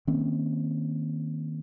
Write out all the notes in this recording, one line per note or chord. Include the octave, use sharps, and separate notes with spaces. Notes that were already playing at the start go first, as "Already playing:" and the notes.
D#3 A#3 C4 C#4